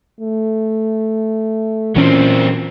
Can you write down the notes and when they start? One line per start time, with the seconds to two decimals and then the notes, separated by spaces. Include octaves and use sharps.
0.20 A3
1.96 A#2 E3 F#3 C4 C#4